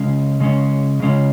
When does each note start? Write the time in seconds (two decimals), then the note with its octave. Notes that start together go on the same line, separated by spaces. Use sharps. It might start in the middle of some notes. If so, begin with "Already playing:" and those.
Already playing: C#3 G#3 C#4
0.40 C#3 G#3 C#4
1.00 C#3 G#3 C#4